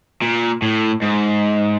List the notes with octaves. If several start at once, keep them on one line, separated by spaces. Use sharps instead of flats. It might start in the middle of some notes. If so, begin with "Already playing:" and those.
A#2
A2
G#2